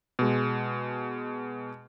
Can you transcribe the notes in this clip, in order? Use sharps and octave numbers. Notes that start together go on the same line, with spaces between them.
B2 G#3